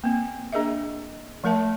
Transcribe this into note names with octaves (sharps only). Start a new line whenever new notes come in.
A#3 C4
A#3 D4 G#4 A#4 D#5 E5
F3 A3 A#4 E5 A5